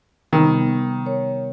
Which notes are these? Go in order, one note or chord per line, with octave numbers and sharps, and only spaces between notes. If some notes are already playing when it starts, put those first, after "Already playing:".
C3 D#3 G3 B3
A#4 C#5